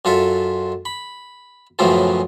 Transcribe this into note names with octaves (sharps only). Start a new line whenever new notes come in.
F#2 F4 A4 E5
B5
F#2 A2 C#3 E3 F3 F4